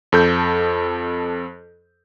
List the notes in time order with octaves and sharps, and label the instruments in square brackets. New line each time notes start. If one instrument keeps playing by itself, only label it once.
[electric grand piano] F2 A4 G6